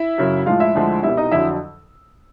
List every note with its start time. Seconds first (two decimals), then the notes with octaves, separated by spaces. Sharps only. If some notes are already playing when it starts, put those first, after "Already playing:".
Already playing: E4 E5
0.18 F#2 C#3 F#3
0.46 A2 F3 G#3 F4 F5
0.60 E4 E5
0.75 D2 D3 F3 G#3
1.03 C2 B2 G3 E4 E5
1.17 D#4 D#5
1.31 F2 D3 F#3 E4 E5